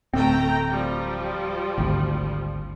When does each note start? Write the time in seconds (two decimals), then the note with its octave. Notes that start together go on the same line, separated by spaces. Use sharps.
0.14 D1 A3 C4 G5 A#5
0.71 F3 G3
1.78 G#1 D2